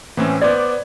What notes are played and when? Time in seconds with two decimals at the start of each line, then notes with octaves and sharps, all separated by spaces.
0.17 A2 E3 C4 C#4
0.42 B3 C5 D5 G#6